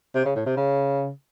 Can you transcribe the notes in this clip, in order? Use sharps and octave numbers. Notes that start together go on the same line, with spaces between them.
C3
C#3
A2
C3
C#3